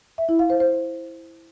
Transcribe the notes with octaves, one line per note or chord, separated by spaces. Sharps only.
E5
E4
F5
C5
C5